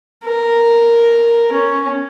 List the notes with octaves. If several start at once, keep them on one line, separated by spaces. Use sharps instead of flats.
A#4
C#4